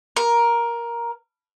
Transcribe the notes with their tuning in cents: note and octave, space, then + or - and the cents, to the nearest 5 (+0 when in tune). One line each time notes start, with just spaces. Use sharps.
A#4 +10